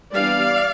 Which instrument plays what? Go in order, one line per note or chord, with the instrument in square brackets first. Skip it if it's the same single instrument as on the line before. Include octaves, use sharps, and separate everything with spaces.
[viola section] E3 G3 B3 D4 D5 F5